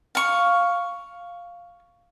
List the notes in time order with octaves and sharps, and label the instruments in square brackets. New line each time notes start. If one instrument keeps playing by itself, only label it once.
[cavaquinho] F5 C#6